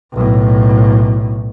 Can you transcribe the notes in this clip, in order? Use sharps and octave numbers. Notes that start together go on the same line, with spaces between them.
B1 A2